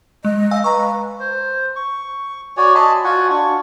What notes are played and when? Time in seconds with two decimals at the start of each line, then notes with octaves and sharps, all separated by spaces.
0.25 G#3 D#5
0.51 F5 G#5 E6
0.64 B4 A#5 C#6
1.20 C5
1.76 C#6
2.57 F#4 C#5 D5 G#5
2.75 D#5 A5 B5 C6
3.04 F4 F#4 F#5 G#5
3.30 D4 C#6